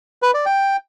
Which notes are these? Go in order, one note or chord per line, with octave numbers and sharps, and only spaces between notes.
B4
D5
G5